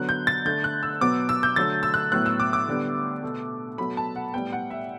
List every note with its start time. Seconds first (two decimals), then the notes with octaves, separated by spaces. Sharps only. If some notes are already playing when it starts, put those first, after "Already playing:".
Already playing: D3 F#3 B3 F#6
0.09 G6
0.27 A6
0.45 D3 A3 G6
0.64 F#6
0.83 E6
1.01 B2 F#3 B3 D6
1.29 E6
1.43 G6
1.56 D3 F#3 A3 A6
1.83 E6
1.94 F#6
2.12 A2 F#3 B3 F#6
2.26 E6
2.40 D6
2.53 D6
2.68 D3 G3 B3
3.23 B2 A3
3.78 B2 F#3 A3 B5
3.97 A5
4.16 F#5
4.34 A2 G3 B3 G5
4.53 F#5
4.70 E5